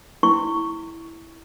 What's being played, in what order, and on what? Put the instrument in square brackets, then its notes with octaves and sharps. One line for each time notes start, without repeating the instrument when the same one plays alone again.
[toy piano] E4 C#6